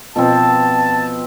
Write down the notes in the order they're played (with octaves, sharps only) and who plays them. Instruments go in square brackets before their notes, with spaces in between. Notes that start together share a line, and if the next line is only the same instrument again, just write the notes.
[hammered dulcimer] B2 F3 C4 [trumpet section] A5